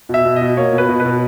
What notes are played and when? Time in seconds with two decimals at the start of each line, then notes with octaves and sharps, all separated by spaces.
0.09 B2 E5
0.25 B2
0.36 D#5
0.41 B2
0.57 A#3 C#5
0.73 B2
0.78 B4
0.89 B2
1.00 B4
1.05 B2